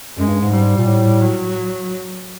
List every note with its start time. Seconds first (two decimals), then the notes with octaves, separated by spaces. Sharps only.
0.17 F#2 G#3
0.29 G2
0.41 G#2
0.52 G3
0.77 A#2
0.87 A2
1.21 F#3